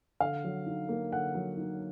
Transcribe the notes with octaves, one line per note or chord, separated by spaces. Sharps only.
D3 F5
F#3
D#4
A#3
D3 F#5
F#3
D#4